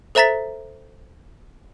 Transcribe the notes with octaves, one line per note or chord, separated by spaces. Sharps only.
A4 C5 E5 A#5 A6 B6